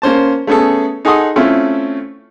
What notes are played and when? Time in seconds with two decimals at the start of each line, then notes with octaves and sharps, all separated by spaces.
0.02 A#3 C#4 C5 A5
0.47 A3 B3 C#4 G#4 A4
1.05 D#4 G#4 A4 F#5 C6 D#6
1.36 A3 C4 C#4 E4 F4 A4